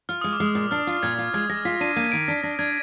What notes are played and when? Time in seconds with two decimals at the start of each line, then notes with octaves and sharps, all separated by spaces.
0.09 F4 F6
0.21 G#3 D#6
0.33 D6
0.40 G#3
0.46 D#6
0.55 A#2
0.71 D4 F6
0.87 F4
1.03 A#2 G#6
1.18 F4
1.34 G#3 G#6
1.49 G#3 A#6
1.65 F4 B6
1.81 D4 D#7
1.96 A#3 D#7
2.12 D#3 D7
2.28 D4 B6
2.43 D4 A#6
2.59 D4 G#6